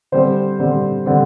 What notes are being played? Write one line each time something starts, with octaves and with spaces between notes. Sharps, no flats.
D3 G3 C4 C5
D3 G3 C4
D3 G3 C4